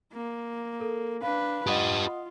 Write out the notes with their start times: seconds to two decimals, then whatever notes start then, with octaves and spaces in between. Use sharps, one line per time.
0.12 A#3
0.80 A4 A#4
1.22 D4 B4 F5
1.67 F4 G4 B4 D#5 F#5 D#6